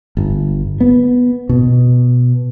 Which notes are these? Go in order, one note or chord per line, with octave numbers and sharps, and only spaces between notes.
G1
B3
B2